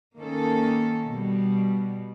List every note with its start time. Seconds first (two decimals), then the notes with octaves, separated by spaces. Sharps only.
0.18 D#3 A#3 C#4 A4
1.08 B2 G3